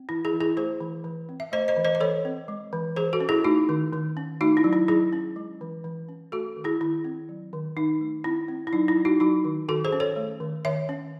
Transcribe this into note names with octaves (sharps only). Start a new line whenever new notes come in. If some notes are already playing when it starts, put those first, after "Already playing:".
Already playing: C4
E3 E4
E4 G#4
E3
E4 G#4
A3 G#4 C5
E3
E3
C4
E5
A3 C5 D#5
C5 D#5
E3
C5 D#5
D#5
E3 A4 C#5
C4
G#3
E3
E3 G#4 C5
F#4 A4
C#4
E4 G#4
A3 D#4 F#4
D#3
D#3
C#4
A3 D#4 F#4
E4
F#3
E4
F#3 E4 G#4
C#4
G#3
E3
E3
C#4
A3 F#4 A4
D#3
E4 G#4
D#3 E4
C4
F#3
D#3
D#3 D#4
A3
C4 E4
C4
E4
F#3 D#4
E4
F#3
D#4 F#4
F#3 D#4 F#4
D#3
D#3 F#4 A4
G#4 C5
C#4
A4 C#5
A3
D#3
D#3 C#5 E5
C#4